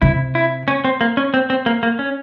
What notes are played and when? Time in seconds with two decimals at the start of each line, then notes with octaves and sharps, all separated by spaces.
0.02 C3 E4
0.35 E4
0.68 C#4
0.85 C4
1.01 A#3
1.17 C#4
1.34 C4
1.50 C4
1.66 A#3
1.83 A#3
1.99 C#4